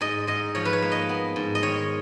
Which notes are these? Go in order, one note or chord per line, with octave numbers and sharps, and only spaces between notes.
G#2 D#5
G#2 D#5
F3 C#5
B4
C#5
A#3
D#5
B3
G#2
D#5
D#3 C#5